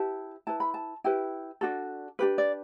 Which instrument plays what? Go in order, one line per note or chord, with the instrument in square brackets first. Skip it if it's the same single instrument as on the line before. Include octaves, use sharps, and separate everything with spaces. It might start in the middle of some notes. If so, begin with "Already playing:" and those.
Already playing: [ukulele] E4 G4 B4 A5
E4 B4 A5
B5
A5
E4 G4 B4 G5
D4 F#4 A4
D4 G4 B4
D5